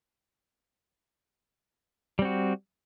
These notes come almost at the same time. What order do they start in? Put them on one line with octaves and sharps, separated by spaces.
G3 C4 F#4